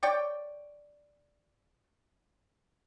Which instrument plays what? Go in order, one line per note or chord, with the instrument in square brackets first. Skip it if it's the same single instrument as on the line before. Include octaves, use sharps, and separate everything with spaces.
[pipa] C#5 D5 G5